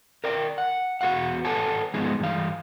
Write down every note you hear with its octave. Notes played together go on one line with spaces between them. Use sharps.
A#4 D5 G5
F#5
E2 B3 F#4 F5 F#5
A4 B4 C#5 F#5 G#5 A5
F3 G#3 B3 D#4 G#4
G2 E3 F5